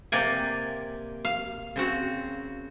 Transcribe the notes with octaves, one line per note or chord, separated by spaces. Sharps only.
C3 A#3 D5 G5 G#5
F5
C#3 C4 F#4